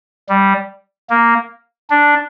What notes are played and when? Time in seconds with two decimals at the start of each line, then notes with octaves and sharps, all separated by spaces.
0.29 G3
1.10 A#3
1.90 D4